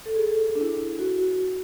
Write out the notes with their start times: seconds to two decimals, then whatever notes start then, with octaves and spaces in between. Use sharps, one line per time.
0.06 A4
0.16 G#4
0.27 A4
0.42 G#4
0.55 D4
0.61 E4
0.80 E4
0.99 F#4
1.18 F#4